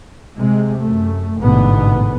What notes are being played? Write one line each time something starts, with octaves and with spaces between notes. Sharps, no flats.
C3 G#3
F#2 A3
A1 G#2 B2 D3 B3